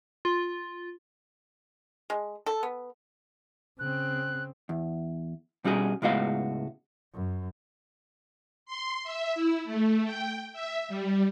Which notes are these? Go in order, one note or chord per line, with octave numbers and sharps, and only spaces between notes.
F4
G#3
A4
B3
C#3 C4 F#6
E2
B2 G3 C#4 F#4 G#4
C#2 A2 G#3 B3 F#4 F5
F#2
C6
E5
E4
A3
G5
E5
G3